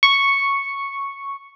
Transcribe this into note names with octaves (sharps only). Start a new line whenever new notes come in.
C#6